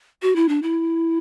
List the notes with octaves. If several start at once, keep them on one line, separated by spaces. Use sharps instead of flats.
F#4
E4
D4
E4